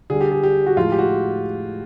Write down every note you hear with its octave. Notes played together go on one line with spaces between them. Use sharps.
D3 G3 G#4
G4
G#4
G4
F#4
A2 F3 G#3 F4
G4
F#4